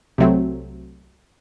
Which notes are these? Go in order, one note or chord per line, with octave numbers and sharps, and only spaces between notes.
C2 C3 F#3 A3 C4